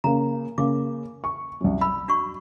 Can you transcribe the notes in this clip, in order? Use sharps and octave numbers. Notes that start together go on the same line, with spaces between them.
C#3 A#3 A#5
C#3 A#3 D6
C#6
C2 F#2
B5 E6
D4 F#4 C#6